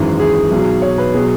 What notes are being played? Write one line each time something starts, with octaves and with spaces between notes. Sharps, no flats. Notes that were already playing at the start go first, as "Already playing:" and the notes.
Already playing: G#1 F#2 E3 G#3 G#4
G#4
B1 B2 F#3
C#5
B4
B2 F#3 G#4